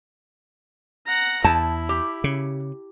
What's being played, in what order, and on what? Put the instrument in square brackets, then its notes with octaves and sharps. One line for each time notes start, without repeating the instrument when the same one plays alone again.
[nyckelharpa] F#5 A#5
[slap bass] E2 [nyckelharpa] E4 [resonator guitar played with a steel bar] A5
[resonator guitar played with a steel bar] G4
[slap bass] C#3